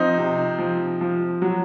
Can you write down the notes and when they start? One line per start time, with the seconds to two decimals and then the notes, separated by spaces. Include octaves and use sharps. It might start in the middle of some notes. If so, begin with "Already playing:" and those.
Already playing: F3 C4 D#4
0.18 C3
0.58 F3
1.01 F3
1.42 F#3